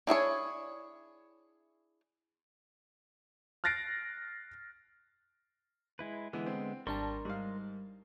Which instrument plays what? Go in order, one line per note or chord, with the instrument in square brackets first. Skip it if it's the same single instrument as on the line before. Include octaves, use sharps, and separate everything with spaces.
[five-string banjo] D4 E4 G#4 C#5
[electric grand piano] F6 F#6 A6 A#6 C7 D7
[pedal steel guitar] G#3 E4 B4
[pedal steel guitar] D3 G#3 B3 [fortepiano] E3
[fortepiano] C4
[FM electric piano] G#1 D4 A5 [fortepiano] G3 [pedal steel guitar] A#4 C6 C#6
[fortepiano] G#2 F5 [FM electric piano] G3